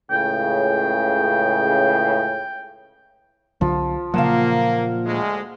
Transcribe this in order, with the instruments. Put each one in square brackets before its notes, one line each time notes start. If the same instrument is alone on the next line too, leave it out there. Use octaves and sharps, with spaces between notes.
[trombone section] C#2 A2 C#3 [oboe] G5
[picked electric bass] C2 D3 F#3 [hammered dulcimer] F3
[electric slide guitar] A#2 F3 A5 [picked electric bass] C#3 F#3 [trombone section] A#3 [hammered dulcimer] F5 F#5
[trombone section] D2 G#3